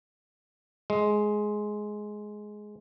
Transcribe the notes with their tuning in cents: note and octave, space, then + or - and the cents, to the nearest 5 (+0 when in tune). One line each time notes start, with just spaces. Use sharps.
G#3 +10